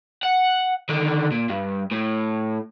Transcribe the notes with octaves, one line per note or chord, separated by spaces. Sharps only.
F#5
D3 D#3
A#2
G2
A2